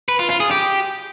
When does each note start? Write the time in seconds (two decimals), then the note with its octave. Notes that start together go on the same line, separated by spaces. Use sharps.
0.09 B4
0.19 F4
0.30 F4
0.40 G#4
0.51 G4